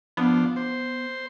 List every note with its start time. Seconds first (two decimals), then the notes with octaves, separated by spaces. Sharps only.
0.17 F3 B3 D4
0.56 C5